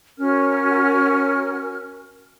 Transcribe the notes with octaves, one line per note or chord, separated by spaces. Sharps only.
C#4 F#4 A#4 F6